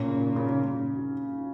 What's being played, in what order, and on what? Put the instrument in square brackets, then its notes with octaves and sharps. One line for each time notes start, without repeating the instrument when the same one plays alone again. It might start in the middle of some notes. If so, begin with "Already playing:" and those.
Already playing: [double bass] A#2 [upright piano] C#4
[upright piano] C#3
C#3
C#3